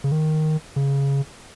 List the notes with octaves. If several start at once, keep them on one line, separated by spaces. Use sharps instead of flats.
C#3
D#3
C#3